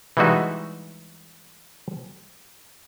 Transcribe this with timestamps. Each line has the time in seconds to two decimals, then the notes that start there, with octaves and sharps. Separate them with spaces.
0.17 E3 G3 G#3 D#4 F#4 E5